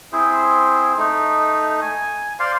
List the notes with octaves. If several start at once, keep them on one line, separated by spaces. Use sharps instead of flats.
C4 E4 G#4 C5
A3 D#4
G#5
C5 D5 F5 C6